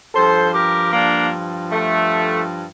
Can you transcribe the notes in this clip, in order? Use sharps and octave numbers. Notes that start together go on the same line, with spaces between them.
G2 F3 A4 C5
G4 A#4
A#3 D4
A3